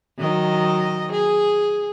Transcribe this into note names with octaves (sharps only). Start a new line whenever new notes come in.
D#3 F#3 D#5
G#4